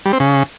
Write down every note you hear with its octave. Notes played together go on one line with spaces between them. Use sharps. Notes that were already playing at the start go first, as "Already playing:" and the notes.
G3
C4
C#3